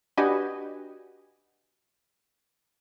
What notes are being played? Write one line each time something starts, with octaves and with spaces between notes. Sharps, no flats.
D4 F#4 G4 B4 D#5 G#5